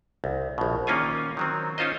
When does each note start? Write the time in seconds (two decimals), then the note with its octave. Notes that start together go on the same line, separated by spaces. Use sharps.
0.24 C2
0.58 A#1 B2
0.87 D#3 A#3 C#4 F4 G#5
1.37 D#3 F#3 C4
1.78 C#4 D#4 F4 C5 D#5